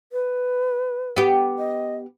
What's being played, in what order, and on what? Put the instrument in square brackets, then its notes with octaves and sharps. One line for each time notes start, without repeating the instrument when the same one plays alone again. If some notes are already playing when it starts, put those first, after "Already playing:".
[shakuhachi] B4
[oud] B3 G4
[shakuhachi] D#5